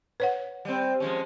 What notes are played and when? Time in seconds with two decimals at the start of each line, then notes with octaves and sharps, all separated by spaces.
0.20 B4 C#5 F#5
0.65 G3 C4
1.00 F3 G#3 C#4